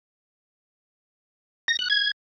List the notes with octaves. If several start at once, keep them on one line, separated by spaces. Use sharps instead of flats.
A#6
F#6
G#6